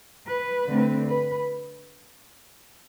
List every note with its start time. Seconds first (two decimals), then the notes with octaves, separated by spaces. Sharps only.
0.27 B4
0.68 D3 A3 C4
1.07 B4